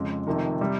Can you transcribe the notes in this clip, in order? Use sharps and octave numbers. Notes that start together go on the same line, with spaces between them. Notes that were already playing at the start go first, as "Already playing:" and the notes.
Already playing: F2 C#3 G#3
F1 F2 C3 D#3
C3 G3